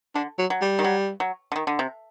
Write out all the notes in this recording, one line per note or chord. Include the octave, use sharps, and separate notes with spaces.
D3 D4
F#3
F#3
G3
D#3
F#3
F#3
D3
D#3
D3
C3